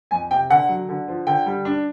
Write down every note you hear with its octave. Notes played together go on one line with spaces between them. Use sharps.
F2 G#5
C3 G5
D3 F#5
F#3
D3
F3
D3 G5
G3
D4